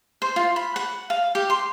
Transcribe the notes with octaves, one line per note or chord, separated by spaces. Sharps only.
C5
F4
B5
F#5
F5
G4
C6